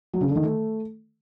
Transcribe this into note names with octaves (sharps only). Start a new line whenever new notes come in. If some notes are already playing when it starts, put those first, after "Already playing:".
F#3
C#3
D3
D#3
A3